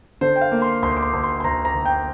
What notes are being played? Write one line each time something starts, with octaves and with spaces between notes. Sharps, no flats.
D3 C5
G5
F5
A#3
C6
D2 C6
D6
C6
D2
C6
C6
D2 A#5
A#5
D2
G5